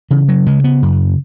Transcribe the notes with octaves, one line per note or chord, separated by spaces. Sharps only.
C#3 E3
F#3
C#3 G#3
B3
F#2